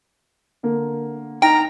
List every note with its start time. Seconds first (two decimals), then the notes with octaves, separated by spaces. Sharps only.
0.63 D3 A#3
1.42 D#4 G5 A#5